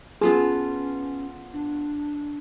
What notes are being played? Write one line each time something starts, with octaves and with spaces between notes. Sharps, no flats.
B3 C#4 F4 G#4 A5
D4